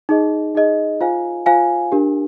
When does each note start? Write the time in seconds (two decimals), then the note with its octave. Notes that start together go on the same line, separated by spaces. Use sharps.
0.09 D#4 G#4 D#5
0.55 D#4 G#4 D#5
1.01 F4 C5 F5 G#5
1.46 F4 C5 F5 G#5
1.92 D4 G4 A#4